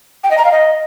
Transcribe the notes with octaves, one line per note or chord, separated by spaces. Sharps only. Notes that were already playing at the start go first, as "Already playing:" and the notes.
G5
D#5
A#5
F5
D#5